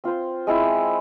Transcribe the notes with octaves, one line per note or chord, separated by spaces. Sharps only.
C4 F4 C5
G#3 C4 E4